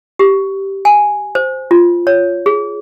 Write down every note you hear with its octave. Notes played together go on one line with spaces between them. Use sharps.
G4
G#5
C5
F4
C#5
G#4